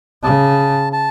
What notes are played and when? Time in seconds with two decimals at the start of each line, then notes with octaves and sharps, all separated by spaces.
0.23 C#3 A5
0.93 A5